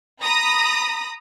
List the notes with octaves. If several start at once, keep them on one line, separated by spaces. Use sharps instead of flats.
A#5 B5 D#6 A#6